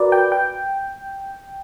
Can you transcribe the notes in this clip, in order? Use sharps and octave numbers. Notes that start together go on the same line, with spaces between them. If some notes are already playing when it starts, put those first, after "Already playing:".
Already playing: F#4 A#4 B4 D5
G5
G5